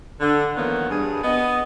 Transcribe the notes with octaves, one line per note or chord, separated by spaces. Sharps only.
D3
D#3 E3 F#3 A#3 B3
G2 G#4
B3 D#5